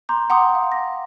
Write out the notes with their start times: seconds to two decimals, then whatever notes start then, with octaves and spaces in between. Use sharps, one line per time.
0.09 A#5 C6 D6 G6
0.30 F#5 G5 A#5 C6 D6 D#6
0.55 F5
0.72 A#6